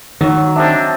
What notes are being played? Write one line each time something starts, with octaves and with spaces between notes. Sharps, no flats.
D#3 F#3
C4 D4 D#5 E5